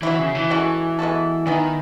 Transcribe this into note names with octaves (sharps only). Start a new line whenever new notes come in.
E3 F#3 B3 E4
C#3
E3
G#3 C#4 F#4 A4
G#3 B3 F#4 A4
D#3 E3 B3 D#4